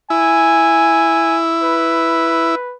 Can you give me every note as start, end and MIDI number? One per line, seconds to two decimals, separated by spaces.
0.10 2.55 64
0.10 1.40 80
1.63 2.75 71